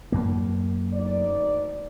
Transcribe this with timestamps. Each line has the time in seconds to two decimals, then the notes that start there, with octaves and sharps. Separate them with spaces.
0.12 F#2 A#3
0.93 D2 D#4 D5